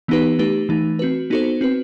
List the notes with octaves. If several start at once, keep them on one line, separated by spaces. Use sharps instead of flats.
E3 B3 D#4 G4 B4
A3 D#4 G4 B4
E3 A3 D#4
C4 F#4 B4
B3 D#4 F#4 A4 C5
C4 F#4 B4